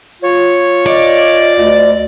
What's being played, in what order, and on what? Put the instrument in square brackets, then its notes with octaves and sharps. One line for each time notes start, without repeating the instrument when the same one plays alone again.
[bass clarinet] F4 [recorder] C#5
[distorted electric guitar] D5 [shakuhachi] D#5
[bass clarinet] D2